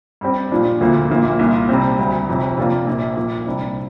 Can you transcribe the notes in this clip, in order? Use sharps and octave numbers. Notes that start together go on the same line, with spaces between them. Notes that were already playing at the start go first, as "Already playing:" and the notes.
G2 G3 C4 G4
A#2 F3 D4
D2 D3 F3 A#3
A#1 A#2 A#3
C2 A#2 A#3
C3 G3 C4
D2 C3 G3
G1 F2 C3
C3 A#3 D4 F4
A#1 A#2 A#3
A#1 A#2 A#3
C2 C3 G3 D4